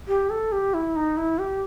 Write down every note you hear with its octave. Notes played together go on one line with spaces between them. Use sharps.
G4
A4
G4
E4
D#4
E4
G4